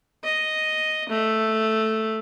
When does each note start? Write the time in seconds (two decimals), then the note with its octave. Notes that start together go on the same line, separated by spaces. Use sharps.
0.24 D#5
1.09 A3